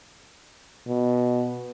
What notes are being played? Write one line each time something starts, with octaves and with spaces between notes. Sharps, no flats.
B2